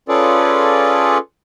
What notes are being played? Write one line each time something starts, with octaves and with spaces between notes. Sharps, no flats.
C#4 F4 G#4 A4 B4 D5